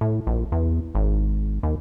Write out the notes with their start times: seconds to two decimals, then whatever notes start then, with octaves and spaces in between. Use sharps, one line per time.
0.01 A2
0.27 A#1
0.52 E2
0.95 G#1
1.63 D#2